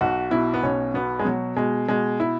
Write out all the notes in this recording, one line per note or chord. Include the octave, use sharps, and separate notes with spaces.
B1 F#4
B2 E4
B3
B1 C#4
B2 B3
G#3
B2 F#3
B2 G#3
B2 G#3
E4